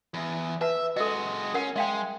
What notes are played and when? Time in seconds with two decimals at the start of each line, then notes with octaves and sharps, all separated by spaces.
0.14 E2
0.61 B4 E5 A5
0.97 G#3 F#4 A4 D#5
1.54 C#4 A#4 F#5
1.76 G#3 E5 F5 G5